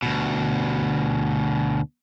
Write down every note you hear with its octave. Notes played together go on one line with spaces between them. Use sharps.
D2 B2